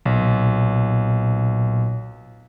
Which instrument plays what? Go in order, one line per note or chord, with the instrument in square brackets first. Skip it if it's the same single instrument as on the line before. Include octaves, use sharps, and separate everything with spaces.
[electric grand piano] B1 [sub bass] A#2